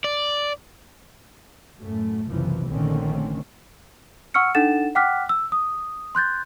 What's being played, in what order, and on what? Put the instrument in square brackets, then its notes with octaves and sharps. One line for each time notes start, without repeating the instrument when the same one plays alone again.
[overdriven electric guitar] D5
[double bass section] F#2 A2 A3
F#1 C2 C3 E3 F3
A#1 D3 D#3 A3 C4 C#4
[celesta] F#5 C#6 E6 F6 C#7
D4 D#4 A4 F#5 A6 E7
F#5 G5 D6 F6 F#6 B6
E6
D#6
C6 F#6 G6 A6